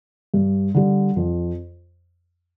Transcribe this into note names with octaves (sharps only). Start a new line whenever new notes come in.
G2
D3 G3
F2